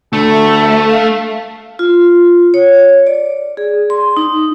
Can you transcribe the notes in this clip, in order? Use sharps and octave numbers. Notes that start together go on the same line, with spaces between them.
D2 A3 A4
E5
F5
F4
C#5
D5
G#4
C6
D#4